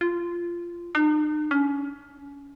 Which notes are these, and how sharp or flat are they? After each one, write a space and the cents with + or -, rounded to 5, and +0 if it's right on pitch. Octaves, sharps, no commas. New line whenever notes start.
F4 -15
D#4 -45
C#4 +30